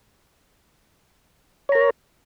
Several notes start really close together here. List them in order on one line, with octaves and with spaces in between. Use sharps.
C#5 A#5 A#4